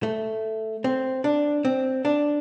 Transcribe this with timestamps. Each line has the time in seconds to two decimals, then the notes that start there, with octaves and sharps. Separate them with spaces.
0.03 A3
0.84 C4
1.24 D4
1.65 C4
2.05 D4